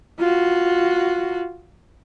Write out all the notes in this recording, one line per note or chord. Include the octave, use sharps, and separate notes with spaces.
F4 F#4